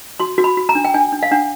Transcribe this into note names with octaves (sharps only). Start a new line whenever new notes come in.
F#4 C6
F#4
B5
F#4
A#5
D4
G5
D4 G#5
D4
F5
D4 F#5